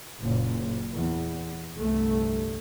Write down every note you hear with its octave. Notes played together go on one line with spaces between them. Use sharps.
F#1 A#2 C#3
E2
G1 C2 A3